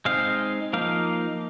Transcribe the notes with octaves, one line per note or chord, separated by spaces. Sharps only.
G#3 C4 D#4 F5
F3 A#3 D#4 F5